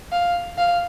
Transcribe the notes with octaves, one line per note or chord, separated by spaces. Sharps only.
F5
F5